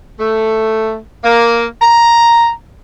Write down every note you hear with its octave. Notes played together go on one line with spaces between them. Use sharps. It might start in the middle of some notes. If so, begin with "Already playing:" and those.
A3
A#3
A#5